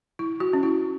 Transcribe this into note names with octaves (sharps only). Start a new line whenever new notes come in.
E4
F#4
C#4
E4